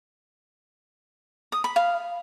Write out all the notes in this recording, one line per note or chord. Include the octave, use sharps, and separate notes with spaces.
D#6
B5
F5